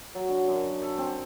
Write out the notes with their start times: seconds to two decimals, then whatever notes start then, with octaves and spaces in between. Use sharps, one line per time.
0.15 F#3
0.29 D3
0.48 F#2
0.82 A4
0.98 C4